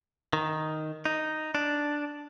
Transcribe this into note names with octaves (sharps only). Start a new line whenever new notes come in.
D#3
D#4
D4